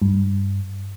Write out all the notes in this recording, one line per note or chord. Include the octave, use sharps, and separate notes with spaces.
G2